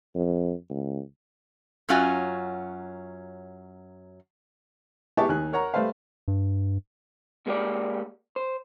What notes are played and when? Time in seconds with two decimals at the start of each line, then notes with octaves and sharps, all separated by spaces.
0.15 F2
0.70 C#2
1.89 F#2 F#3 C#4 F4 F#4 G#5
5.17 B3 E4 G4 G#4 A5 C#6
5.29 D#2 D#4 G#5 F#6
5.53 A#4 C#5 F#5 A#5
5.74 G3 A3 B4 C5 F5
6.28 G2
7.46 A#2 G#3 A#3 F4 G4 D5
8.36 C5